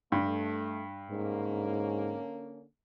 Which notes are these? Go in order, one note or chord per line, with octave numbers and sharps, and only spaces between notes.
G2 A3
G#2 D3 A#3 C#4